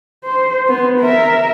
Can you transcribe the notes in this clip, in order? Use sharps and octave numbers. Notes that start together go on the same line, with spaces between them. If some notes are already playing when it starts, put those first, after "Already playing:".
C5
B3
A#4 E5